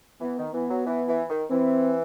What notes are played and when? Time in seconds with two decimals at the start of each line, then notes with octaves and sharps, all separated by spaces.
0.21 E3 B3
0.38 D#3
0.54 E3 B3
0.70 F#3
0.87 E3
1.08 E3
1.30 D#3
1.51 E3 C4